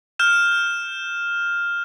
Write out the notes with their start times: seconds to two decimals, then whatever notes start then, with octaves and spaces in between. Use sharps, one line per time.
0.19 F6 G6 E7